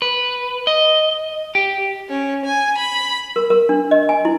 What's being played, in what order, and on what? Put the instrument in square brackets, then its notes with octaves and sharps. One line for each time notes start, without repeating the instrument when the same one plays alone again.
[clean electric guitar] B4
D#5
G4
[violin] C#4
G#5
B5
[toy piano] A#4
A#4
D4
D#5
G#5
E4